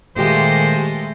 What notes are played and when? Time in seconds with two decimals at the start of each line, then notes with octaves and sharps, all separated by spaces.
0.16 A#2 D#3 G#3 A3 G4 C5